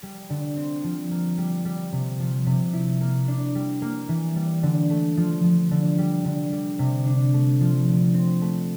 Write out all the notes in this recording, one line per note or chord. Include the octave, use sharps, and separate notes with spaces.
G3
D3
C4
F3
A#3
G3
G3
C3
F3
C3
E4
A#3
D4
G3
A#3
E3
G3
D3
A3
F3
F3
D3
G3
D3
G3
C3
D4
A3
F3
D3
C4
A3